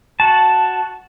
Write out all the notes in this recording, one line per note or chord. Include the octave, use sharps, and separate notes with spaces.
F#4 A5